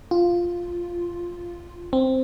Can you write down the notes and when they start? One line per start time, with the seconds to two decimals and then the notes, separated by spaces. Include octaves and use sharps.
0.11 F4
1.93 C4